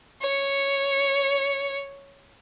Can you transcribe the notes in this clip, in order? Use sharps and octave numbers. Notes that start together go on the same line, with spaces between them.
C#5 C#7